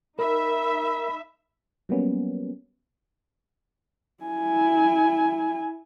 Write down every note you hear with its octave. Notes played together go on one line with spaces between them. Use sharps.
D#4 A#4 E5 B5
F#3 G3 A#3 B3 C#4
E4 G#5